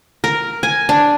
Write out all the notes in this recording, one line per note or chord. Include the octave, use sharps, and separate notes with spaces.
A#4
G#5
D4